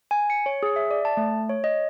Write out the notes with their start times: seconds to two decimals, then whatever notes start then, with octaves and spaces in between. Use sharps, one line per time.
0.11 G#5
0.30 C#7
0.46 C#5
0.63 G#4
0.76 E5
0.91 D5
1.05 A5
1.17 A3
1.49 C#5
1.64 D#5